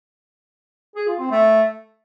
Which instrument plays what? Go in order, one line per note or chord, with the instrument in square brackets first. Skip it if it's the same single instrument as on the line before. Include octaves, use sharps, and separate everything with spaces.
[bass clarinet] G#4
F4
C4
A3